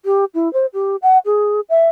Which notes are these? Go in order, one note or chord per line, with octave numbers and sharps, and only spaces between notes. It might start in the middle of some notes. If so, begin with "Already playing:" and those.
G4
E4
C5
G4
F#5
G#4
E5